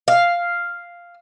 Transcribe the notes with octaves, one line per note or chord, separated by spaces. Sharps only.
F5